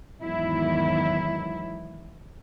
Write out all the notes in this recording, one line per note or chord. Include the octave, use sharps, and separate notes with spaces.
E2 G#2 D#3 F#3 B3 E4